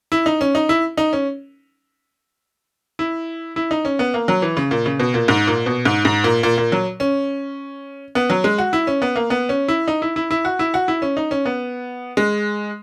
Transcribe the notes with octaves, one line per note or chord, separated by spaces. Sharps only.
E4
D#4
C#4
D#4
E4
D#4
C#4
E4
E4
D#4
C#4
B3
A#3
F#3
E3
C#3
A#2
C#3
B2
A#2
G#2
A#2
B2
G#2
G#2
A#2
A#2
A#2
F#3
C#4
B3
F#3
G#3
F#4
E4
C#4
B3
A#3
B3
C#4
E4
D#4
E4
E4
E4
F#4
E4
F#4
E4
C#4
D#4
C#4
B3
G#3